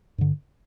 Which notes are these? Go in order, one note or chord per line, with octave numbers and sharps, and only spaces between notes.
G2 D3